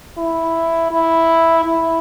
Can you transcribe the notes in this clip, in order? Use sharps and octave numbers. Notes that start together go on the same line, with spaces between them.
E4
E4
E4